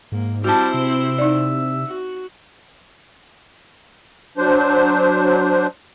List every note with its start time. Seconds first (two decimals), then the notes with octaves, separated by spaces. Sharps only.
0.12 G#2 A#3
0.44 G3 C4 E4 F#4 C5 A5
0.74 C3 E5
1.19 D#4 D5
1.86 F#4
4.37 F#3 D4 C5